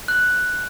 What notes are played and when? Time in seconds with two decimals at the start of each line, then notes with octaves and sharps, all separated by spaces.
0.08 F#6